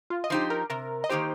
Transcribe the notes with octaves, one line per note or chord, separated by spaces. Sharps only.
F4
D#5
F3 D#4 G4 C5
A#4
C3 A#4
D#5
D#3 A#3 D#4 G4 C5